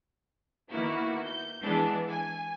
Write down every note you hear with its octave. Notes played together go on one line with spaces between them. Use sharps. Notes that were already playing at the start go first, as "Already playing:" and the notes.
D#3 A#3 B3 E4 F#4
G6
E3 G#3 B3 D4
G#5